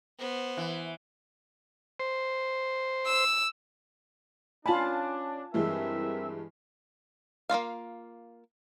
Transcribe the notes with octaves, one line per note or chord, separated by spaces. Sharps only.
B3 C5
E3
C5
E6
C#4 D4 F4 G#5 A5 B5
G2 E3 G#3 C4 A#4 E5
A#3 C#4 F4 F5